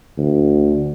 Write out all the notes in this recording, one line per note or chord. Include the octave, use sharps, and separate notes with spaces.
D2